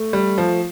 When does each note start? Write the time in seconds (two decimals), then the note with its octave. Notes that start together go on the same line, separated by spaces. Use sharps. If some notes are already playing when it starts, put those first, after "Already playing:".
Already playing: A3
0.13 G3
0.38 F3